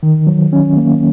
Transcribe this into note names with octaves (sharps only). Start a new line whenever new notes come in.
D#3
F#3
C#4
A#3